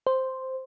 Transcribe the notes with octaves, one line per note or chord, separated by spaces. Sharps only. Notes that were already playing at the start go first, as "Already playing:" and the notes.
C5